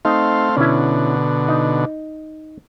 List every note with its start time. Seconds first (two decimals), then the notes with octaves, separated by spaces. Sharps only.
0.05 A3 C4 D#4 F5
0.57 B2 D3 C#4 E4
1.48 D#4